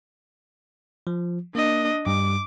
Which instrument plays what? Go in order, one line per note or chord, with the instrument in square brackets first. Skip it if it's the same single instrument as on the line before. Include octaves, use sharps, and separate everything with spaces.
[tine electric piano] F3
[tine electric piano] A#3 [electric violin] D4 D#5
[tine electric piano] G2 G3 [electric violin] D6